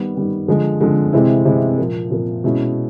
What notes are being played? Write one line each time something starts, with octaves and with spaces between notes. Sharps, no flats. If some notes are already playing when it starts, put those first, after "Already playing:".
Already playing: D#3 G3 B3
D#3 G3 B3
D3 F3 G#3
D3 F3 G#3
C3 E3 G#3 C4 E4
C3 E3 G#3 C4 E4
A#2 F3 A#3
A#2 F3 A#3
B2 G#3 C#4 E4